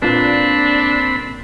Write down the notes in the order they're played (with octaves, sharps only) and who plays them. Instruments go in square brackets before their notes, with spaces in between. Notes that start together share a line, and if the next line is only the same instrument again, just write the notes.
[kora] A#2 B4 [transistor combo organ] C4 B5 [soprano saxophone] D4